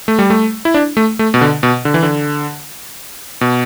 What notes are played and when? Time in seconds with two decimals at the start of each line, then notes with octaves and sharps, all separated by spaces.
0.08 A3
0.19 G3
0.30 A3
0.65 E4
0.74 D4
0.97 A3
1.19 A3
1.34 B2
1.41 D3
1.63 B2
1.85 D3
1.94 E3
2.03 D3
3.41 B2